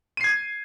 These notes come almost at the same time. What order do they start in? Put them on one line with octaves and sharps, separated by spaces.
D#7 C7 G#6